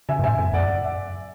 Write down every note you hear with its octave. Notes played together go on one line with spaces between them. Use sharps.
C#3 E5 G#5
G#2
A2 E5 G#5
F#2
F#2 D5 F#5
E5